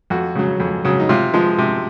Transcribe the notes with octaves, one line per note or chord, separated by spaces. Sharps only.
F2 F#4
C#3 F#3
F2
C#3 F#3
D#4
C3 F4
F3 G#3
C3